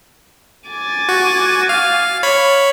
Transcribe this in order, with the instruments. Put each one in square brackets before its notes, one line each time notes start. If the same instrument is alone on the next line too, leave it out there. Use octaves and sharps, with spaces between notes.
[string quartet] G#5 D6 A6
[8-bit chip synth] F#4
F5
C#5 B5